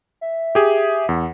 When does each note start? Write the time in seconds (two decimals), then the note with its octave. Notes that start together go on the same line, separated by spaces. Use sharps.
0.21 E5
0.55 G4 G#4
1.09 E2 F#5